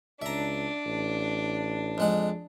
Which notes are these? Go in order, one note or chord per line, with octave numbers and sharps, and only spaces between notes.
C#2 D4 E5 A#5
A1
F2 G#3 F#5